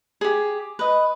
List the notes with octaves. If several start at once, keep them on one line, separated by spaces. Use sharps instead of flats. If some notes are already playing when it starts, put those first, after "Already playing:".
G4 G#4
B4 D#5